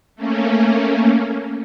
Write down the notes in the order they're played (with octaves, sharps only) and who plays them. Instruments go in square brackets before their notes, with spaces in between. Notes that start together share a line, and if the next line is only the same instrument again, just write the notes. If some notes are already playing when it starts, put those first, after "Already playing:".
[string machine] A3 A#3 C#4